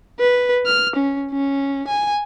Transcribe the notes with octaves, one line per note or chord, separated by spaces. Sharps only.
B4
F6
C#4
C#4
G#5